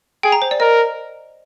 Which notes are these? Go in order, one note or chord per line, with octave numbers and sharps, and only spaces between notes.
G#4 G5
A#5
C5
D5
A#4 D#5